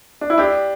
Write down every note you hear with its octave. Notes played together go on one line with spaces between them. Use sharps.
D4
E4
D4 G4